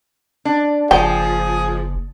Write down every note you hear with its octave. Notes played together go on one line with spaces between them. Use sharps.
D4
F#1 F3 G#4 G5